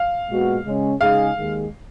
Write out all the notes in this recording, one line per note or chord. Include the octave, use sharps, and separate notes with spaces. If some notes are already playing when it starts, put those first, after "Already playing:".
Already playing: F5
A#2 G#3 B3 F#4
C#3 G#3 C#4
C#3 G#3 D#4 G#4 F5
D#2 D#3 G#3